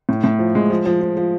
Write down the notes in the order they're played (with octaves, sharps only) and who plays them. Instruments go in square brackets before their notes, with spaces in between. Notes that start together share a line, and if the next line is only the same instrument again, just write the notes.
[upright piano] A2
A2
F3
G#3
F3
F3
F3
F3